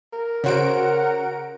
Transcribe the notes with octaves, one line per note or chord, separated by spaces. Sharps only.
A#4
C#3 C#4 F#4 C5 F#5 D7